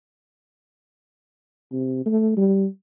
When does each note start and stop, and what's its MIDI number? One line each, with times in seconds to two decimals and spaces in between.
1.72 2.03 48
2.05 2.35 57
2.37 2.66 55